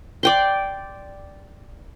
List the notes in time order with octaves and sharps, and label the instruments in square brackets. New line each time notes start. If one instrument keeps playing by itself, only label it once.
[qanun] D5 G5 C6